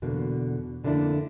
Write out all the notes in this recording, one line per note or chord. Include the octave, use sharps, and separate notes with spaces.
E2 B2 D3 A#3 D4
F2 D3 A3 A#3 D4 E4